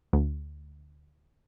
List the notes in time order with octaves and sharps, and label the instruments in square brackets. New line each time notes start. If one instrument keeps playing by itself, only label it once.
[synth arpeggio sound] D2